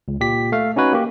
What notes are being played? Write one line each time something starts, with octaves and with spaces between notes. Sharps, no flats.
C#2
A#2 G4 B6
A3 F5
C#4 D#4 F#4 B4 C#5
A#3 G4